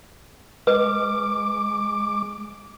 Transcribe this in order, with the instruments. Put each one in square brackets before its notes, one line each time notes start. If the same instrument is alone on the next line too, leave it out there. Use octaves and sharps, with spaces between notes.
[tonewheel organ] G#3 D6 [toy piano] B4